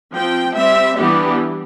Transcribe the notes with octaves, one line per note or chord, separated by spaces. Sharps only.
F3 C4 G5
G3 C4 E5
E3 G3 B3 D4 G4